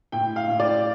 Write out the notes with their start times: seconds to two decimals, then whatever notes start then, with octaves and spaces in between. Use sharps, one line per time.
0.12 A2 G5
0.36 F5
0.48 A2
0.60 D5